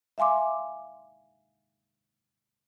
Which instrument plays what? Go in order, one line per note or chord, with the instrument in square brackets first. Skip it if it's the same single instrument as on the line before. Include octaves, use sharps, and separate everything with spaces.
[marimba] E5 F5 G#5 C6 D6